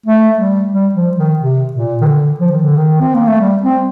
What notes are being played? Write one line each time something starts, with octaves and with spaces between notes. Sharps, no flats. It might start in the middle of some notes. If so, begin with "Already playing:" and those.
A3
G3
G3
F3
D#3
C3
A#2
D#3
D3
F3
D#3
D3
D#3
C4
A#3
A3
G3
C4